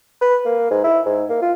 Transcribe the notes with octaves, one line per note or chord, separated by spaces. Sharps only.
B4
A#3
G#2
E4
G#2
A#3
F4